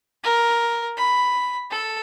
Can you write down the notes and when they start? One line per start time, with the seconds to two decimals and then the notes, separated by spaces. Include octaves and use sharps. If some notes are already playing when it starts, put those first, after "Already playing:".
0.24 A#4
0.97 B5
1.71 A4